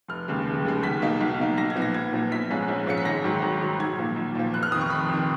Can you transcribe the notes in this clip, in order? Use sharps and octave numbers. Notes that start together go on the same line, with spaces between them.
F1 F6
D#2 C#3 G#3
F1
D#2 C#3 G#3
B1 B6
B2 A#3 D#4
B1
B2 A#3 D#4
B1 A#6
G#6
A#2 F3 B3
A#6
B1 G#6
A#2 F3 B3
A#1 B6
G#2 F3 G#3 C#4
A#1
G#2 F3 G#3 C#4 C#7
B6
G#1 A#6
G#2 D#3 F#3
G#1
G#2 D#3 F#3
B1 G#6
A#2 F3
B1
A#2 F3
F1 F#6
F6
F2 D#3 D#6
C#6
F1 B5
F2 D#3